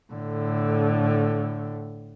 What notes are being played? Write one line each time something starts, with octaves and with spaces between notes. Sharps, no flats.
A2 D3